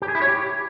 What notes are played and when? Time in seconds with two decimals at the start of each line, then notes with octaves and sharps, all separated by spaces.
0.02 G4
0.08 G#4
0.15 E4
0.22 C#5
0.28 G4